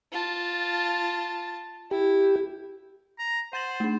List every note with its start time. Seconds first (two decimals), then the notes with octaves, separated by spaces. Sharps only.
0.12 F4 A5
1.91 E4 G4
3.19 A#5
3.53 C5 F#5 A6 F#7
3.80 A3 D4